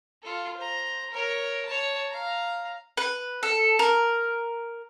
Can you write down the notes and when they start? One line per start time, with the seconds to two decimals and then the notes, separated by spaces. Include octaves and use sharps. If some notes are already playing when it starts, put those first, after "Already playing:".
0.23 F4 A4
0.56 C5 A#5
1.11 A#4 C#5
1.65 C#5 A5
2.10 F5 A#5
2.97 B4
3.43 A4
3.79 A#4